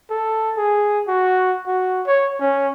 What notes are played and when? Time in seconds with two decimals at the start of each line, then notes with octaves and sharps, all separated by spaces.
0.10 A4
0.57 G#4
1.08 F#4
1.67 F#4
2.07 C#5
2.40 C#4